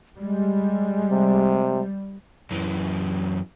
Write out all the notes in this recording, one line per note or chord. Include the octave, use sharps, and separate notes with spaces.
G3 G#3
C3
F#2 E3